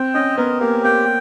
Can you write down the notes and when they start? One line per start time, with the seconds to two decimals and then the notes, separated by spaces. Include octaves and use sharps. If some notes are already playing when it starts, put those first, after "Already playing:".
Already playing: C4 G5
0.14 C#4 D#5
0.37 B3 A#4
0.61 A#3 G4
0.84 A#3 G5